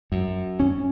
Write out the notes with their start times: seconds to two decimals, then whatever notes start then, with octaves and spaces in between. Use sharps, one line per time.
0.12 F#2
0.60 C#4